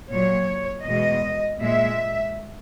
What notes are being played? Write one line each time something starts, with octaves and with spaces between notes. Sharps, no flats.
A#2 F#3 C#5
E2 B2 G#3 D#5
A#2 G#3 E5